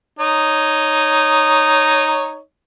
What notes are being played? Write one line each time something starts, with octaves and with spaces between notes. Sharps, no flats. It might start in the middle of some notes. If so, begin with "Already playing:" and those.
D#4 C#5